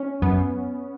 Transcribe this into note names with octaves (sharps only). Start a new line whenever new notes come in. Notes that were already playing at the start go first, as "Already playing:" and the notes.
Already playing: C#4
F#2 B3